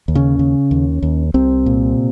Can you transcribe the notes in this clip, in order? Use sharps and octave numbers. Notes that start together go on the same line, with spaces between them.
D#2
C#3 C#4
C#3
D#2
D#2
C2 C3 C4
A#2